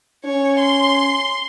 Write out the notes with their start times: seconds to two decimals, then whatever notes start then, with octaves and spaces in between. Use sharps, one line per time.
0.25 C#4 C#5
0.60 C6